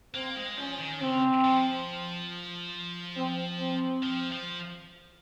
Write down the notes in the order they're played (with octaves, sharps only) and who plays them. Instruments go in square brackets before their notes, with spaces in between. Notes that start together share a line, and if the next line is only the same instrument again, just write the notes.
[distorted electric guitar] A#3 [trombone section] C4
[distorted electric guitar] G#3
[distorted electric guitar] F3 [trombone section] C#4
[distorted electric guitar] D#3
[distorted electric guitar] C#3 [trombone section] C4
[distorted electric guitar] F3
[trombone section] C4
C4
[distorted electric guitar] F3
F3